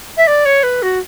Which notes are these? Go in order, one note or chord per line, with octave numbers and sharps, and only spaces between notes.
E5
D5
C#5
B4
F#4